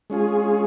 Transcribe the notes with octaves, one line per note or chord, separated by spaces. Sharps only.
G#3 C#4 F4 G#4